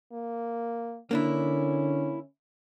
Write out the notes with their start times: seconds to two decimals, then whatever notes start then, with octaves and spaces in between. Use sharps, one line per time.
0.13 A#3
1.11 D3 A#3 C#4 D4 E4